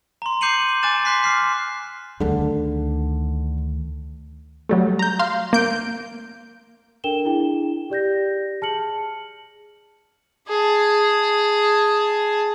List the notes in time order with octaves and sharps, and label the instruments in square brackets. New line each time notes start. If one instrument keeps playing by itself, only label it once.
[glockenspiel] A#5 C6
D6 G6 C7 C#7 D#7 F#7
G#5 D6 F#6 A6 E7
C6 F#6 B6 C7
D6 F6 C7
[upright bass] D2 D#3 [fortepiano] D3
[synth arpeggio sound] F#3 G3 A3
A#5 G6
F5 C6
A#3 G6 D7
[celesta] D4 A4 A#4 G5 E7 G7
D4 E4 G#4 G5
G4 D5 G6 A#6
G#4 A5 F6 C#7 F#7
[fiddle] G#4 A5